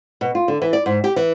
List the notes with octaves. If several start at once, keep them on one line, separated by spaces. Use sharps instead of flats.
B2
F4
D3
E3
D5
G#2
G4
E3